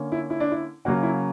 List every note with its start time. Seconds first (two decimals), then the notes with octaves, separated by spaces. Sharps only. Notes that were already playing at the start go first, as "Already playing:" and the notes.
Already playing: D3 A#3 C#4
0.12 E4
0.30 E4
0.40 D4
0.51 E4
0.85 C#3 F#3 A#3 C#4 F#4
1.03 E4